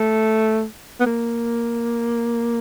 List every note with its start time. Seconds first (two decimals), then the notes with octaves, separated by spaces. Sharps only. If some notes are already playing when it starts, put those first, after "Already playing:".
Already playing: A3
1.00 B3
1.06 A#3